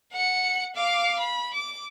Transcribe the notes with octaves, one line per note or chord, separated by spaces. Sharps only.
F#5 C#7
F5 D6
B5
D6